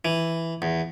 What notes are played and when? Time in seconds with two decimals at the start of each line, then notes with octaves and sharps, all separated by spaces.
0.05 E3
0.62 E2